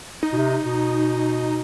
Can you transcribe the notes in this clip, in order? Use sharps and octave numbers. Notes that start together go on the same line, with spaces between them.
D#4
B2
C3
B2